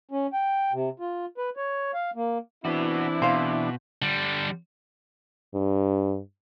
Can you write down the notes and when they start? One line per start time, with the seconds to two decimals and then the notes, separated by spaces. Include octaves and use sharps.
0.11 C#4
0.33 G5
0.73 C3
1.00 F4
1.38 B4
1.57 C#5
1.94 F5
2.15 A#3
2.65 E3 B3 C4 D4 E4 F#4
3.22 B2 C5 F5
4.02 D3 G3
5.55 G2